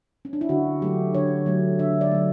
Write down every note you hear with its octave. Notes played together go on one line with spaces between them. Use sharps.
C#4
D4
E4
D3 F#4
F#3 A3 G4
D3 C#5
F#3 A3
D3 E5
D5
F#3 A3